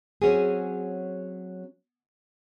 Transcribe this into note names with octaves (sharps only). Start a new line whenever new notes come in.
F#3 C4 C#4 F#4 G#4